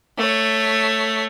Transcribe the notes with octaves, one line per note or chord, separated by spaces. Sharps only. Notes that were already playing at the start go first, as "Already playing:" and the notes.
A3 C#5